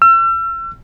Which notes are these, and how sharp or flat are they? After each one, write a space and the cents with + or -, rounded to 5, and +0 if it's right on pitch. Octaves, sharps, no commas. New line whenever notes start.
E6 +40